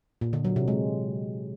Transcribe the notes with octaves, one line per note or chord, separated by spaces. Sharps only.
A#2
D3
F#3
C3
G#3